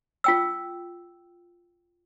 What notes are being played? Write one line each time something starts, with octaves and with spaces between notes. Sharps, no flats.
F4 G5 E6